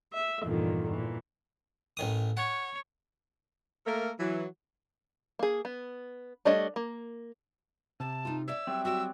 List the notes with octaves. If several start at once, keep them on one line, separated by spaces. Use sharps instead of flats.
E5
E2 G2 A#2 D3 D#3 F3
A#2 E3
A1 D#3 D#6
C#5 F#5
A3 A#3 A4 A#4
E3 F#3
A#3 G#4
B3
G3 A3 D4 C#5 D#5
A#3
C3 A5
D#4 F4
C#5 D5 E5 E6
F#3 G3 C4
F#4 G5 E6